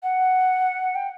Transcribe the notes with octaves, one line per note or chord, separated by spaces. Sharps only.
F#5
G5